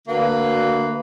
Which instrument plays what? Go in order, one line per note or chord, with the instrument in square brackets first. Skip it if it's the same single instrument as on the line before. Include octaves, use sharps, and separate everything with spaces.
[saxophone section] D2 D3 A#3 F#4 B4